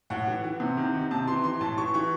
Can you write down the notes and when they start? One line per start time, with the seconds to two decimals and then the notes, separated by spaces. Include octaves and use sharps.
0.10 A2 F#5
0.27 E3
0.44 E3
0.60 C3
0.77 D#3
0.94 D#3
1.11 C3 A5
1.27 E3 C6
1.43 E3 C6
1.61 A2 A5
1.77 E3 C#6
1.94 E3 C#6